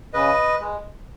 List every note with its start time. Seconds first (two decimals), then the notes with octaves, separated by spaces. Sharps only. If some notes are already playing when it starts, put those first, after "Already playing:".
0.13 C#3 B4 D#5
0.60 G#3